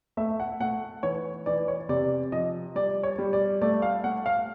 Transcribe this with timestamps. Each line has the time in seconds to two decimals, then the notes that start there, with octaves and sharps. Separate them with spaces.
0.17 A3 E5
0.40 F#5
0.60 A3 F#5
1.03 E3 C#5
1.46 E3 D5
1.68 C#5
1.89 C3 D5
2.32 F3 D#5
2.75 G3 D5
3.03 C#5
3.18 G3
3.33 D5
3.62 A3 D5
3.82 F5
4.04 A3 F#5
4.26 F5